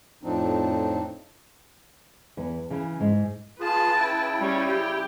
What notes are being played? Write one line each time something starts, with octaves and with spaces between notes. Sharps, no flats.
F2 A2 F3 C4 D4 D#4
E2 B4
C#3 E3
G#2
F4 G#4 B4 A5
C#3 E4 G5
G3 C#4
G4